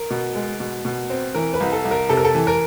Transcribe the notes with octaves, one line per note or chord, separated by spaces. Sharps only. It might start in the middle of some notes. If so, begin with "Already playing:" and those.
Already playing: A#4
B2
G#3
B2
B2
C4
E3 A#4
B4
C2
A4
C2
A#4
C3 A4
A#4
A4
E3
A#4